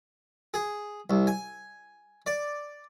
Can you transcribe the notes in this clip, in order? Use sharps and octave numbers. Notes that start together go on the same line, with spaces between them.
G#4
C2
G#5
D5